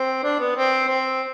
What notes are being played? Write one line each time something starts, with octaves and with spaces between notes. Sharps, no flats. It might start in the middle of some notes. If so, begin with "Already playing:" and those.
Already playing: C4
D4
B3
C4
C4